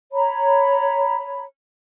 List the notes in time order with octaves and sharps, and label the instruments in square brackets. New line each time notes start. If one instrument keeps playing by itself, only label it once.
[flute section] C#5 A#5 B5